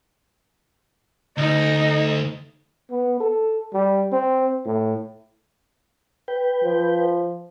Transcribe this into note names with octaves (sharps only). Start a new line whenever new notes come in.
D2 D#4
B3
A4
G3
C4
A2
B4 G5
F3